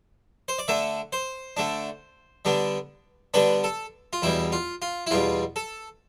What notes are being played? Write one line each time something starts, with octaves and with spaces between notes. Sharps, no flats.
C5
D5
D3 A3 D4 E5
C5
D3 A3 D4
D3 G3 B3 D4
D3 G3 B3 D4 B4
A4
F4
E2 B2 G3 E4
F4
F4
E4
E2 B2 G3 F4
A4